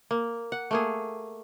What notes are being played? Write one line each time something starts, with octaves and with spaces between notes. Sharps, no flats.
A#3
F#5
A3 A#3 G#4